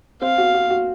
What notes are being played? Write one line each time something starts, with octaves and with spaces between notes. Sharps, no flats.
C4 F5
F#4
F#4
F#4